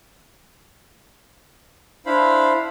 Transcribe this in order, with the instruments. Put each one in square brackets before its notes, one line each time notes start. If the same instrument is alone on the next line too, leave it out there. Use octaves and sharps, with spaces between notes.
[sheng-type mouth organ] D4 E4 C5 F5 B5